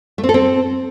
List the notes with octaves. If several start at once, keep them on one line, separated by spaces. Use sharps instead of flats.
A3
C4
A4
C4